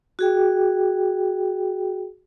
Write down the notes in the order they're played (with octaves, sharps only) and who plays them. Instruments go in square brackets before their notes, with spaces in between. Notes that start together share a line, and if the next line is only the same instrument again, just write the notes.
[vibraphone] F#4 G#4 G5